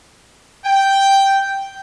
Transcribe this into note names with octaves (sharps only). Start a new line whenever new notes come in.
G5